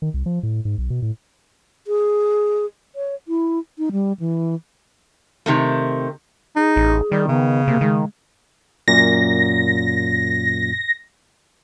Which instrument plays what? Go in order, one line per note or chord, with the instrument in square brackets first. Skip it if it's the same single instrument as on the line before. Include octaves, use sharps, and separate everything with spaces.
[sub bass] D#3
C2
F3
A2
G#2
B1
B2
A2
[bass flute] G#4
C#5
E4
D#4
G3
E3
[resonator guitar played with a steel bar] C3 D#3 A3
[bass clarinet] D#4 [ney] G#4
[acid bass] A1
[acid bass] D#3 [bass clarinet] G3
[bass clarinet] C#3 [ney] B3
[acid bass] C3 [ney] A#3
[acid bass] D#3 [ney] G#3
[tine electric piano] F#2 A#2 [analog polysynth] A#6